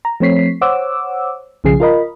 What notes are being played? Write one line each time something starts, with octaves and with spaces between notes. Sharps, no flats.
A#5
F3 A3 C4 C#5 B6 C7
C5 C#5 F#5 D6 E6
B1 C#3 F3 G#4 C7
F4 A#4 D#5 B5